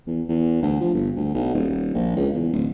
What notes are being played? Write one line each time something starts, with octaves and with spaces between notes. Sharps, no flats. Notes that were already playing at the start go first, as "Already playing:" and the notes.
E2
E2
D2
F3
G1
D2
B1
D#1
A#1
C#2
E2
D1